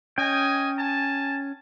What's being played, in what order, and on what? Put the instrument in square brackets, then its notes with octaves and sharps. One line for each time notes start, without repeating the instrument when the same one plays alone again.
[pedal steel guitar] C#4 G5 [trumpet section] D#5 G#5
[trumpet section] G#5 A5